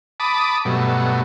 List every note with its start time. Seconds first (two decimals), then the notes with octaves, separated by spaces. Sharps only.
0.20 A5 B5 D6 D#6
0.65 G2 B2 F#3 A3